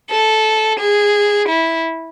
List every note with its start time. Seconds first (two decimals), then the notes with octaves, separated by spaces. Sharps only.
0.11 A4
0.80 G#4
1.49 E4